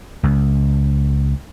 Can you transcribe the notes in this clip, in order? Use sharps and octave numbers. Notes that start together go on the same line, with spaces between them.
C#2